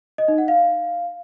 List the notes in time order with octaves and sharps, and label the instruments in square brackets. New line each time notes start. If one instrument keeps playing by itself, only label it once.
[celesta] D#5
D#4
F#5
F5